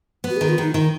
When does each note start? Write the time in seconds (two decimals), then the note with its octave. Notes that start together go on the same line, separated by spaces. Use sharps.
0.24 B3
0.30 F#4
0.37 G#4
0.41 D#3
0.49 F4
0.58 D#3 D#4
0.74 D#3 D#4